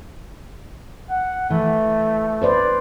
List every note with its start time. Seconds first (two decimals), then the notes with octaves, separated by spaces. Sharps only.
1.10 F#5
1.50 E3 A3
2.42 B4 C5 D5